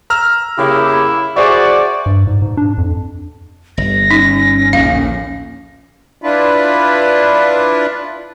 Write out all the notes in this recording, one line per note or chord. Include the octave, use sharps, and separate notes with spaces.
A#5 E6 F6
C#3 A#3 E4 G4
F#4 G#4 C5 D5 E5
G2
G#2
G#2
D4
F2
G1 A#6
C#4 D#4
A#1 D#2 A2 F5
D4 E4 F4 B4